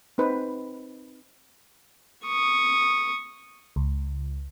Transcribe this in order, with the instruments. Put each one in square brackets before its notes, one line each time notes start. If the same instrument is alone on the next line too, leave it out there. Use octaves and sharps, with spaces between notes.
[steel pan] C4 D#4 B4 C5
[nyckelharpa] C#6 D#6
[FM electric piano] C#2